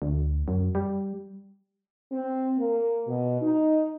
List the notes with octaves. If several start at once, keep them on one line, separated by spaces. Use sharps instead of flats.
D2
F#2
G3
C4
A#3
B2
D#4